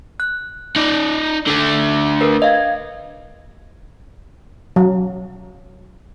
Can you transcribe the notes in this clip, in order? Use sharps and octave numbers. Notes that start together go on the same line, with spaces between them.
F#6
D#4 D5
D3 A3
A#4 B4
D#5 F5 G#6
F#3